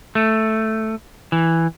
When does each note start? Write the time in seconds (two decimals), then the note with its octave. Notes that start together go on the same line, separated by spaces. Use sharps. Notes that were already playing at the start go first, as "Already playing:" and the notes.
0.15 A3
1.32 E3